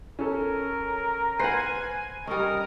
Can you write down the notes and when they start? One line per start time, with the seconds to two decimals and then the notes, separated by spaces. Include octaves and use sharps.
0.19 C#4 A4 A#4
1.39 B4 C5 F#5 G#5 A#6 C7
2.27 G3 C#4 A#4 D#5